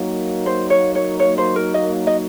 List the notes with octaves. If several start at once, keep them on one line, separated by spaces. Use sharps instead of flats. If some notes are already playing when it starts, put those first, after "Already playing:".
Already playing: F#3 A#3 D#4
C5
C#5
C#5
C#5
C5
A#4
D#5
D#5